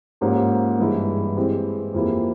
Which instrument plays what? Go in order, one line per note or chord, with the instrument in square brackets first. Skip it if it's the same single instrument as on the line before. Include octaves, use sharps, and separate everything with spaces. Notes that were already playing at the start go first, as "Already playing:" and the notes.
[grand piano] G#2 F3 A#3 C#4 G4
G2 E3 G#3 E4
E3 G#3 C4 G4
F2 E3 A#3 E4 G4